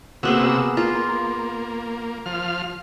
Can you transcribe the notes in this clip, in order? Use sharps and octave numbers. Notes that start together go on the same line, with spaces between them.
C3 A#3 B3 F#4 G#4 E6
A#3 F4
F3 F6